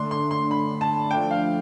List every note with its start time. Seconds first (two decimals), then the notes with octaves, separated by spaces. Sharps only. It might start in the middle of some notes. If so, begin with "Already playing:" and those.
Already playing: D3 A3 D4 C6
0.11 C6
0.31 C6
0.51 B5
0.81 A5
1.11 F3 A3 D4 G5
1.31 F5